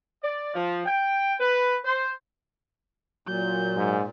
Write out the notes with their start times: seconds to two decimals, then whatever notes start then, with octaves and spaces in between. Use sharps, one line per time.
0.23 D5
0.54 F3
0.86 G5
1.40 B4
1.84 C5
3.27 A#2 F#3 G6
3.77 G#2